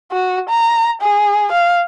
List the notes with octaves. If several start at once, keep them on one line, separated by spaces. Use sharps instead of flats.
F#4
A#5
G#4
F5